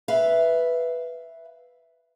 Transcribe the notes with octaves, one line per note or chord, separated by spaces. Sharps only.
B4 E5 F5